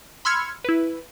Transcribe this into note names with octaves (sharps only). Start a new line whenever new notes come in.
B5 C6 E6 F6 G#6 C#7
E4 B4